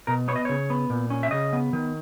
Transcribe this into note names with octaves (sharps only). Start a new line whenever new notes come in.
B2 A#4
B3 C#5
D#5
C#3 C#5
B3
A#2
C#4
E5
C#3 D#5
B3
D#3